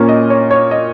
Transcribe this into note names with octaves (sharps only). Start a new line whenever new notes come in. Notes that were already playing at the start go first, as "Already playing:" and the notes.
Already playing: A#2 A#3 C#4
D#5
C#5
C#5
D#5